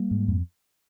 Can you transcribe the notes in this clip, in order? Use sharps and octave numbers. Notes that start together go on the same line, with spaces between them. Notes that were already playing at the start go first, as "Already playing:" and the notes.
Already playing: G3 A#3
G#2
F2